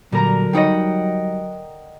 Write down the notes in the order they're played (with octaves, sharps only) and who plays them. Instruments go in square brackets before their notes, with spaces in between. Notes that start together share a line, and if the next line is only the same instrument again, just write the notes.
[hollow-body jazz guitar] A#2 G3 [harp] D3 A#4 A#5 [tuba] F#3
[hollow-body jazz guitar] G3 D#4 C#5 [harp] D#5 F#5 G5